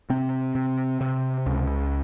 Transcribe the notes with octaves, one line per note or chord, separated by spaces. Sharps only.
C3 C4
C3
C3
C#2